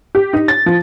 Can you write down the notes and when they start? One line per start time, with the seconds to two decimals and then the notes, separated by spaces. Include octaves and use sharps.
0.15 G4
0.33 D#4
0.48 A6
0.66 F3